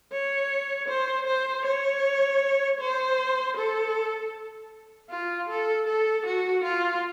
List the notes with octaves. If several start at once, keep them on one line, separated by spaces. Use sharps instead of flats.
C#5
C5
C5
C#5
C5
A4
F4
A4
A4
F#4
F4